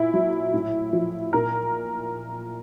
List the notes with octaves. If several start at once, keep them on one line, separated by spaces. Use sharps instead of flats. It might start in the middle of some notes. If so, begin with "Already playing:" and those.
Already playing: A#2 E4
F#3
A2
F3
A#2 A#4